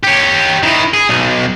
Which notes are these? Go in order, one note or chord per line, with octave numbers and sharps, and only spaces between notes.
G4 C#5
D#3 E4
G#4
B1